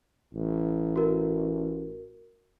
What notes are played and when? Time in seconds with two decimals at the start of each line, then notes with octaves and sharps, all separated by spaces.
0.34 A1
0.96 F#4 A#4